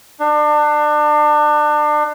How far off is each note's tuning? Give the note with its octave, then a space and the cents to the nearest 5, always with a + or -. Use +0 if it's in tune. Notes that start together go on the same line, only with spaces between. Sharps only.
D4 +30